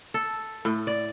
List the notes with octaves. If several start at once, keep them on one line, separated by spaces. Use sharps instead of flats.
A4
A2
D5